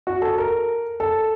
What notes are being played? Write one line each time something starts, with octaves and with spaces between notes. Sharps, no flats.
F#4
A4
A#4
A4